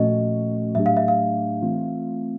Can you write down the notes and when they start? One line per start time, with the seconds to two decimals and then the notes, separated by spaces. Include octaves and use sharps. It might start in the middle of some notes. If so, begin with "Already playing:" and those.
Already playing: A#2 F3 A3 C#4 F#4 D#5
0.75 A2 F#3 A3 D4 G4 E5
0.86 F5
0.97 E5
1.08 F5
1.62 E3 A3 C4 F4